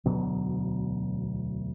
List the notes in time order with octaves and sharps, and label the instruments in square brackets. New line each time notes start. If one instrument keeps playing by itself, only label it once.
[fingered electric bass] E1 D2 B2 F#3